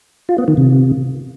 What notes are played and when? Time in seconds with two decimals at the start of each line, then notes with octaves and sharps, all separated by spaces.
0.29 F4
0.38 B3
0.48 D#3
0.57 C3